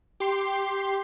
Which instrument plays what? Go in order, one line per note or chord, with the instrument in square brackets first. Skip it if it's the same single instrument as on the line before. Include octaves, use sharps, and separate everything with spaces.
[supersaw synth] G4 C6